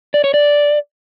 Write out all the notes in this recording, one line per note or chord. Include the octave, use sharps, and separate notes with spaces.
D5
C#5
D5